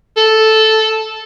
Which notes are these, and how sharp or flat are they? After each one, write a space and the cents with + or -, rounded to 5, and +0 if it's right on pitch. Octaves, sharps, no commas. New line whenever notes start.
A4 -5